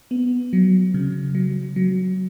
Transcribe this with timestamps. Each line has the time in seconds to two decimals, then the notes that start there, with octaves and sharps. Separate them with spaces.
0.11 B3
0.53 F#3
0.94 C#3
1.35 F#3
1.76 F#3